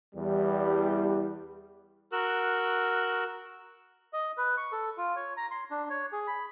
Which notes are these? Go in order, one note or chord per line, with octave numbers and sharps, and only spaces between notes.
E2 G3
F#4 A#4 E6 F#6
D#5
B4
C#6
A4
F4
C#5
A#5
C6
D4
C#5
G#4
B5